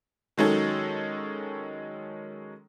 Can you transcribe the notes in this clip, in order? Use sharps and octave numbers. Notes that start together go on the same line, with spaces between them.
D#3 F#3 G#3 C#4 D#4 A4